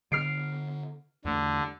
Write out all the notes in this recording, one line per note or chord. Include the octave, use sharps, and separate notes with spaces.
D3 B3 F6 C7 D7
E2 D3 A3